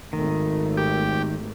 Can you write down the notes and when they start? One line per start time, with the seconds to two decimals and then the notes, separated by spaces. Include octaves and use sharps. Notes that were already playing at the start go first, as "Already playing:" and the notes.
0.13 G#1 D#3 A3
0.77 G4